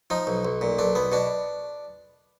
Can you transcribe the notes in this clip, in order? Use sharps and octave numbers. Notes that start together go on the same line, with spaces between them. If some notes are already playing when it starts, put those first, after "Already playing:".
F3 D#4
B1
B1
A#2
B1 D4
B1 B3
B2 D4